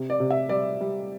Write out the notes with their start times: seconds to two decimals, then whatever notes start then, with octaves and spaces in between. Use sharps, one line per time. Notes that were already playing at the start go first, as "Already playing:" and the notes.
Already playing: C3
0.10 D5
0.20 C3
0.30 E5
0.49 G3 D5
0.81 G3